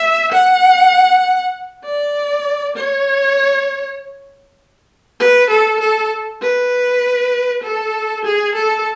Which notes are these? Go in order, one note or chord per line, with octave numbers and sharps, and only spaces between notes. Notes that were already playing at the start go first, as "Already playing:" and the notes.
Already playing: E5
F#5
D5
C#5
B4
A4
A4
B4
A4
G#4
A4